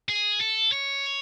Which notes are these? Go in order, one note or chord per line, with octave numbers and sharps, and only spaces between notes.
G#4
A4
C#5